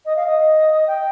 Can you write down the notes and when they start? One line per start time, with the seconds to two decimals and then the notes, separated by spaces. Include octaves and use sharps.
0.06 D#5
0.16 F5
0.27 D#5
0.87 G5